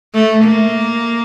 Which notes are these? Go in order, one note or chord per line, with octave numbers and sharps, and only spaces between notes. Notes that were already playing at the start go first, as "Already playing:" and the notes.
A3
A#3